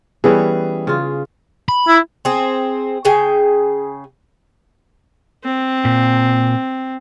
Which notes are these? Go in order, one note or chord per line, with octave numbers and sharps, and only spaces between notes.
E3 G3 B3 C#4 G#4
C#3 F4
B5
E4
C4 G#4
C#3 G#4 G5
C4
A#2